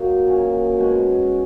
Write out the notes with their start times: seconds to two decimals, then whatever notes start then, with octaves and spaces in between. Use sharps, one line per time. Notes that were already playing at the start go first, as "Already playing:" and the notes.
Already playing: F#3 A#3 D#4 F#4
0.27 A#2 F#3 C#4
0.78 B2 G#3 C#4